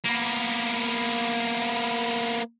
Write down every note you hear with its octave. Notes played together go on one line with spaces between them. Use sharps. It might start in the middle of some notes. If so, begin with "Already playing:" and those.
A#3 B3